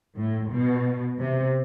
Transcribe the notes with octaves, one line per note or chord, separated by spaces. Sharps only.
A2
B2
C3